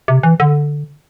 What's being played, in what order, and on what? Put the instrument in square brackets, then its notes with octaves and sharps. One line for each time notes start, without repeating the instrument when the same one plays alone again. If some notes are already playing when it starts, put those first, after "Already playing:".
[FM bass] C3
E3
D3